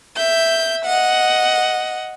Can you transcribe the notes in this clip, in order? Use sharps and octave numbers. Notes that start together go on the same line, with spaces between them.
E5 G6
D#5 F#5